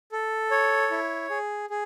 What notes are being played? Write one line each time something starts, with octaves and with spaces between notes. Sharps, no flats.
A4
C#5
E4
G#4
G#4